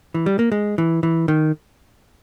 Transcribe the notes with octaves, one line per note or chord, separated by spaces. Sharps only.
E3
G3
A#3
G#3
E3
E3
D#3